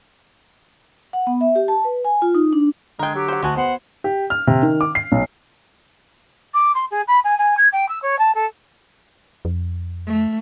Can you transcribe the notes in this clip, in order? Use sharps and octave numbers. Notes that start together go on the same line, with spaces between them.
F#5
B3
E5
G4
A5
B4
G#5
F4
D#4
D4
D3 G#3 A#4 G5 G#6
F#3 G4
C5 F#5
D2 G#3 F#4 G#5 A5
B3 C5 F#5
G4
F6
C3
D#3
D6
C7
B1
D6
C6
G#4
B5
G#5
G#5
G#6
G5
E6
C#5
A5
A4
F2
A3